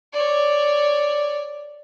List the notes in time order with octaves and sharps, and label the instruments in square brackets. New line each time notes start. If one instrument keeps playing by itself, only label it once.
[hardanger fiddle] C#5 D5